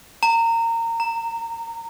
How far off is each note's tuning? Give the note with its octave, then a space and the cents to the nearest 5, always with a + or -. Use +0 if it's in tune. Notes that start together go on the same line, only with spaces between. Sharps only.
A#5 -25
A#5 +0